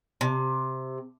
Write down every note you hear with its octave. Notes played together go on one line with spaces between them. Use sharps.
C3